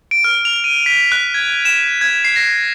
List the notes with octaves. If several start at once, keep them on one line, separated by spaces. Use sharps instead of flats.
D7
F6
F7
D#7
B6
F#6
G#6
E7
G#6
C7
A#6